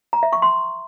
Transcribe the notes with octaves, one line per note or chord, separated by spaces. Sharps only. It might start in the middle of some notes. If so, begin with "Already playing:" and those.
A#5
E5
C#6
C6